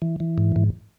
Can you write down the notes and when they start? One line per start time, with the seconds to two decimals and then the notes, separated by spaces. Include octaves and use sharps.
0.02 E3
0.20 E3
0.38 G#2
0.56 G#2